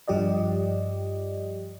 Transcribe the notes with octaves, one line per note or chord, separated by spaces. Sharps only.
G2 F3 G4 D5 D#5